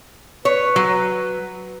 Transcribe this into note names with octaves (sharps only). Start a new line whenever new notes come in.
B4 C#5
F#3